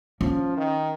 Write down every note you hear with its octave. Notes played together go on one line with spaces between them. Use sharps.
F3 C#4
D#3